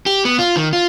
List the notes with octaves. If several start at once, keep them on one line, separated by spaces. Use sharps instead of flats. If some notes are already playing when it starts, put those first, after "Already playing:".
G4
B3
F4
D#3
F4